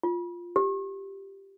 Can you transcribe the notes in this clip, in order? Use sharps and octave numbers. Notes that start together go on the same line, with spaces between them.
F4
G4